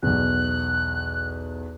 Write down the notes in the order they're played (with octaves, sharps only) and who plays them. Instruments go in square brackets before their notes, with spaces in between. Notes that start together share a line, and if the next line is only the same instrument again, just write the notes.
[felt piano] B1 E2 [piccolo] F#6